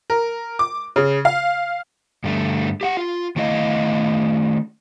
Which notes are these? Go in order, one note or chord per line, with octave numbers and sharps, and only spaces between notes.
A#4
D6
C#3
F5
G2 D3 A3
G4 F5 F#5
F4
D#3 A3 E4 D#5 F5